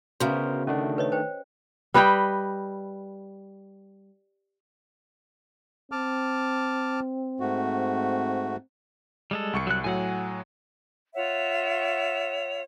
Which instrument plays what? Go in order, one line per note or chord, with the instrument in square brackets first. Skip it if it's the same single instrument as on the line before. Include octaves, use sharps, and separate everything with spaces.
[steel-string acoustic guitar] D2 C#3 [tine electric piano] B3 A#4 C5 [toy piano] F#4 G#4 F5
[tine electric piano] D#3 A3 D4 [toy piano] C#4
[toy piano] B4 C#5 D#5
B4 C5 G5
[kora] G3 B4 D#5 G5
[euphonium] C4 [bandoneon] A5 D6 F6
[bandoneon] G#2 A3 F#4
[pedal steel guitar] G3 G#3 A4
[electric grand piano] C2 C#6 C#7
[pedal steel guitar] F#3 F#6
[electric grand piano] A2 F#3 [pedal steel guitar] F#5 G#5
[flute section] F4 C#5 E5 F#5